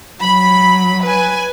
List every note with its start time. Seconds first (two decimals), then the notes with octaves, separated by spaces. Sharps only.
0.21 F#3 B5
1.04 B4 G#5